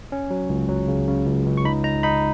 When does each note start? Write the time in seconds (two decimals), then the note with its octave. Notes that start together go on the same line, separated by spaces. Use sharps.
0.12 C#4
0.30 F#3
0.50 C#2
0.69 F#3
0.88 C#3
1.08 C#3
1.26 C#2
1.46 C#2
1.57 C#6
1.65 D#4 B5
1.84 D#4 A#5
2.03 D#4 B5